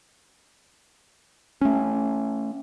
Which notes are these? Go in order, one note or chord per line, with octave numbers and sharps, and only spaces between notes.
A3 C#4